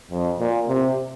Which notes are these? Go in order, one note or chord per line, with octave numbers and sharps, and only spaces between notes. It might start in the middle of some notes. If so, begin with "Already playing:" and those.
F2
A#2
C3